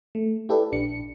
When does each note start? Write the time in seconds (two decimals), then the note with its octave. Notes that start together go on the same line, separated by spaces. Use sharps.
0.15 A3
0.49 E4 G4 A4 B4 D5
0.72 A#1 D4 C#7